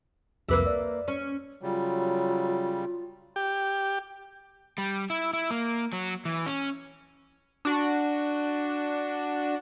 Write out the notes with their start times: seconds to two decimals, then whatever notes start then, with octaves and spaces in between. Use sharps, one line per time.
0.49 C2 F2 A#3 B4 E5 D6
0.66 D5
1.08 C#4
1.63 C#3 F#3 G3 F4
3.36 G4
4.78 G3
5.10 E4
5.33 E4
5.51 A#3
5.93 F#3
6.25 E3
6.46 C#4
7.65 D4 F#4